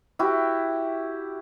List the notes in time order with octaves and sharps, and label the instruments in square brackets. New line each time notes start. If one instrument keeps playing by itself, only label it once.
[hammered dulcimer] E4 F#4 G4